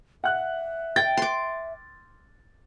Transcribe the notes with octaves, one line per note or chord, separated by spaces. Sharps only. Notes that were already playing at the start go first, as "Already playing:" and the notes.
E5 F#5 F#6
G5 A6
C6 D6